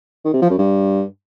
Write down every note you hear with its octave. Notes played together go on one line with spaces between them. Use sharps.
D#3
C3
F3
F#2
G2